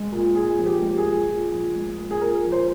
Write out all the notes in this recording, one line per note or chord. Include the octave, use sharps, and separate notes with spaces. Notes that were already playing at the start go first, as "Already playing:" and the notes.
Already playing: G#3
A#2
A#2 G#4
F3
G4
G#3
G#4
A#2
A#2
F3
G#3
A#2
G#4
A#2 A#4
F3
C5